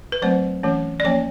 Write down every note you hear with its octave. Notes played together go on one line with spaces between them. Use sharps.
B4
F#3 A3 C4 C5
E3 A3 C#4
D5
F3 A#3 C#4 C#5